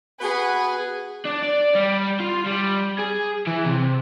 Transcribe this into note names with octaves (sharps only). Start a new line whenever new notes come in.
B3 F#4 G#4 B4
D4
D5
G3
F4
G3
G#4
E3
C3